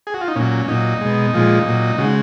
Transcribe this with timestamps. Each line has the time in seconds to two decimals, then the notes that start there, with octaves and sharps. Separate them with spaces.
0.07 G#4
0.14 F#4
0.21 F4
0.28 D#4
0.36 A#2 F#3 C#4
0.68 A#2 F#3 D#4
1.01 B2 G#3
1.33 A#2 F3 G#3
1.66 A#2 F#3
1.98 C#3 G#3 F#4